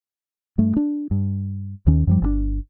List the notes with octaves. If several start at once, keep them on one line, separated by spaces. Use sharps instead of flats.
G2 A3
D4
G2
D#2 D#3 C#4
F#2 F3 G3
G1 A#2 D4